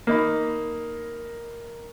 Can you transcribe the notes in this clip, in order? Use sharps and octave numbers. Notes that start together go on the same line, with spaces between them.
A#3 D#4 B5